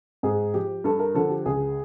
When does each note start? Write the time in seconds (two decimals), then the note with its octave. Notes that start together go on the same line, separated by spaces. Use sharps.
0.23 G#2 G#4
0.54 F3 G4
0.84 G2 A4
0.99 A#4
1.14 D3 F3 A4
1.30 G4
1.45 C#2 G#4